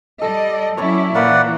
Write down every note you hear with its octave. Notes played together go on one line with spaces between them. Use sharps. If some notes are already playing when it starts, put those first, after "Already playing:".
G3 A4 D5 D#5
F#3 C#4 E4 C#5 D5 C#6
A#2 E3 A#3 B4 D5 F#5